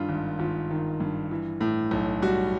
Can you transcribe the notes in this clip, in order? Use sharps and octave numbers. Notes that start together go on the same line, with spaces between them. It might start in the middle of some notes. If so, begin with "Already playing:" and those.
Already playing: G2 D#3 F4
G#1
G#1 F4
D#3
G2
E3
A2
B1
G3 F#4